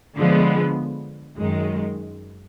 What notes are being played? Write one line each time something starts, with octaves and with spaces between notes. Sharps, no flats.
D3 F3 G#3 B3
F#2 D#3 G#3